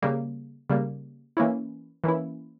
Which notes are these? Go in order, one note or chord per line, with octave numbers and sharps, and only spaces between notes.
C#3 G3 A#3
C#3 G3 A#3
E3 A#3 C#4 E4
E3 A#3 C#4 E4